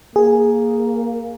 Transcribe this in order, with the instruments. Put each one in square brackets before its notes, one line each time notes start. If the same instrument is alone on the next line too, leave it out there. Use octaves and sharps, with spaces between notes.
[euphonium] A#3 [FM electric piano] G#4